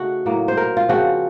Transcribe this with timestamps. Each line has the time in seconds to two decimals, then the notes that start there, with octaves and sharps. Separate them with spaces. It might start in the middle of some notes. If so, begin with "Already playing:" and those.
Already playing: C#3 A3 D#4 F#4
0.26 A2 F#3 A#3
0.48 C5
0.57 A#4
0.77 F4
0.89 C#3 F3 C4 F#4